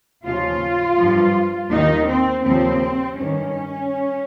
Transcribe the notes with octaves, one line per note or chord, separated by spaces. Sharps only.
D#2 C#3 F3 F4
G2 F3
D#2 D#3 D#4
C4
D#2 C#3 F3 C4
G2 D#3 C#4